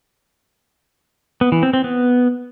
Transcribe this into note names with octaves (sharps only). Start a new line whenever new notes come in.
B3
E3
C4
C4
B3